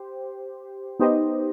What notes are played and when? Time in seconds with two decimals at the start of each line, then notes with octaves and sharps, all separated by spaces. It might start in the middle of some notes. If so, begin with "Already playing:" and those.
Already playing: G4 C5
1.00 B3 D#4 G4 C5 D#5